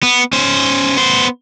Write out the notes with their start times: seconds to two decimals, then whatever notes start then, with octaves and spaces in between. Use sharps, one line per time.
0.03 B3
0.33 C#4 C5
0.97 B3 C5